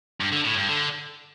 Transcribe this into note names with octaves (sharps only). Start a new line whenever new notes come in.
G2
D3
A2
G2
D3